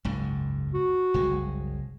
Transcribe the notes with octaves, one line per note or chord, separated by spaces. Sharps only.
F#1 C#2 G#2
F#4
F#1 C2 G#3